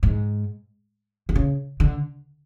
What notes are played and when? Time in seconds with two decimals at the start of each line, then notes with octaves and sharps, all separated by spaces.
0.03 G#2
1.29 D3
1.36 C#3
1.80 D3